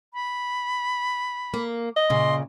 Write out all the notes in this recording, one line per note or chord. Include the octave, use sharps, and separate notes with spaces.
B5
A#3
D#5
A#2 C#3 C6